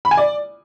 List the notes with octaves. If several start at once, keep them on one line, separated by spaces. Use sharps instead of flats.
B5
G#5
D5